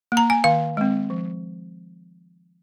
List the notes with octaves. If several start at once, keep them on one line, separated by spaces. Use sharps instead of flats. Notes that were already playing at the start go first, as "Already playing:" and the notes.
A#3
A#5
G#5
D#3 F5
G#3 C4
F3